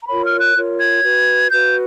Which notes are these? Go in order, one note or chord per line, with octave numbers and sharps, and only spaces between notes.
A#5
F4 A#4 C#5 B5
F6
F#6
F4 A#4 C#5
G#6
F#4 B4
F#4 B4 G6